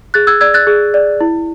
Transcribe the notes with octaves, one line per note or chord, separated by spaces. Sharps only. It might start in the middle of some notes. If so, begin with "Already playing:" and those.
G#4 F#6 A6
E6 G#6
D5 E6 G#6
F#6 A6
G#4
D5
E4